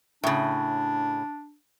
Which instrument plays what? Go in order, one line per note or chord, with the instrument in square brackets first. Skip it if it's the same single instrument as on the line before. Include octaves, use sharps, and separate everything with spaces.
[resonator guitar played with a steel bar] A2 C#3 [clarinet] D4